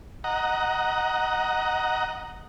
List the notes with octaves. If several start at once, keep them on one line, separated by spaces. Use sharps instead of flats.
D#5 F#5 A#5